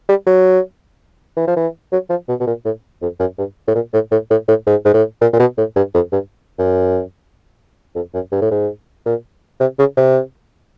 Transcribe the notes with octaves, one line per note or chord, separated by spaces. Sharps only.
G3
F#3
E3
F3
E3
F#3
F3
B2
B2
A#2
A2
F2
F#2
G2
A2
A#2
A2
A2
A2
A2
G#2
G#2
A2
A#2
A#2
B2
A2
G2
F2
G2
F#2
F2
F#2
G2
A2
G#2
A#2
C3
C#3
C3